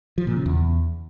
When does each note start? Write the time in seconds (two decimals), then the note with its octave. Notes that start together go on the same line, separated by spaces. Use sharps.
0.18 F3
0.27 A#2
0.36 C#3
0.46 E2